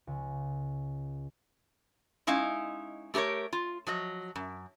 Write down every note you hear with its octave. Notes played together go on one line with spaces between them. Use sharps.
C#2
G#3 C#4 D#4 E4 F5
A3 G4 G#4 A#4 C#5
F4
F3 F#3 D#5
F#2